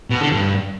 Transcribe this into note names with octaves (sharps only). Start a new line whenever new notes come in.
B2
D3
G2